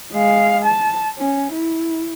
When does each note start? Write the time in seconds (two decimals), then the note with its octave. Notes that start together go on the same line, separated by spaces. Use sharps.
0.12 G#3 F5
0.65 A5
1.18 C#4
1.53 E4